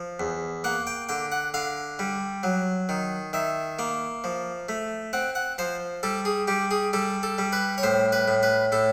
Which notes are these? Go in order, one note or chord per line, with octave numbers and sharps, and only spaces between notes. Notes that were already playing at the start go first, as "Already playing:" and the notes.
Already playing: F3
E2
A#3 F#5
G5
D3 G5
F#5
D3 F5
G3
F#3
D#3
D#3 E5
A#3
F3
A3
C4 F#5
F#5
F3 C5
G3 A4
G#4
G3 G4
G#4
G3 A4
A4
G3
B4
C#5
A2 C5
B4
A2
B4
A2 A4